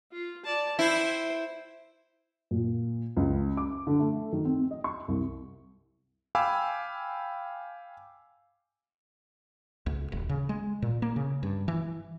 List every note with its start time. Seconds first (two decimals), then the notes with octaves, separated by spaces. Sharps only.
0.12 F4
0.44 D5 A5
0.79 E4 C5 G5
2.51 A#2
3.17 C#2
3.57 D6
3.87 D3
4.00 A3
4.33 D#3
4.45 C4
4.71 D#5
4.84 C#6
5.08 C2
6.35 F5 G5 G#5 B5 D6 E6
9.86 C#2
10.12 D#1
10.29 C#3
10.49 G#3
10.82 A#2
11.02 A#3
11.16 C#3
11.43 G2
11.68 E3